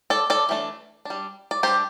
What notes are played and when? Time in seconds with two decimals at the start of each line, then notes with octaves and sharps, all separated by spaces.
0.10 A4 D5
0.30 A4 D5
0.49 E3 A3 D4
1.05 G3 D4
1.51 D5
1.63 G3 D4 G4 C5